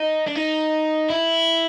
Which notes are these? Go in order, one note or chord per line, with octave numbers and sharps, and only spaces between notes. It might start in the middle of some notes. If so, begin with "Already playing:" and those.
Already playing: D#4
D4
D#4
E4